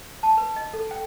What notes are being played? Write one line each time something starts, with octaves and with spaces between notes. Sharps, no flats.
A5
B4
D#5
A4
G5